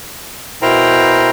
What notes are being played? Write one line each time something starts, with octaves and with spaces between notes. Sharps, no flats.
B2 E4 A#4 C5 G5 A#5